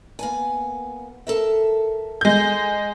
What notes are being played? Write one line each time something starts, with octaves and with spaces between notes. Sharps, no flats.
A#3 B3 G#5
A4 A#4 E5
G#3 G6